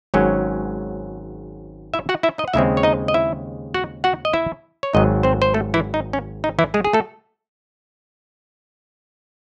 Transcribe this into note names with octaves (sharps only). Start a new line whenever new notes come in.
G#1 G#2 F#3 C#4
E4 E5
F#4 F#5
E4 E5
D#4 D#5
F#5
D#2 C#3 G#3 C4 E4 E5
C#5
D#4 D#5
D#5
E4 E5
F#4 F#5
F#4 F#5
D#5
E4 E5
C#5
G#1 G#2 F#3 D#4 D#5
C4 C5
C5
A3 A4
E3 E4
D#4
C#4
D#4
E3 E4
G#3 G#4
G#4
A3 A4